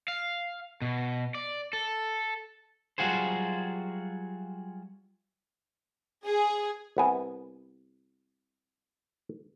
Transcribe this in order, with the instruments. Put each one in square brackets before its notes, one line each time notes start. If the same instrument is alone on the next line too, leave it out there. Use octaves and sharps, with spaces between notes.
[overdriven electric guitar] F5
B2
D5
A4
[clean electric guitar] F#3 G3 F4 F#4 G#4 C5
[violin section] G#4
[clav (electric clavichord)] C2 B3 G#5